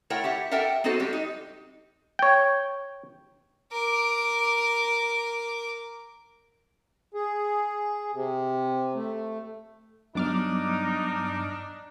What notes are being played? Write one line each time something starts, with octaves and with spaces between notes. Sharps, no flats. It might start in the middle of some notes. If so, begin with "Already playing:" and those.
A3 E4 A#4 C#5 F#5 G5
G4 E5 F#5
A4 A#4 E5 F#5 G5
B3 C4 D#4 F#4 A4 C5
G3 G#3 C4 G4
D#4
C#5 G5
A#4 D6
G#4
C3
A3
G2 F#3 G3 B3 D4 D#4 D6 F6